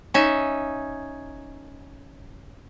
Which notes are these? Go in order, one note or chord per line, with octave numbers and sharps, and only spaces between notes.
C#4 D#4 E5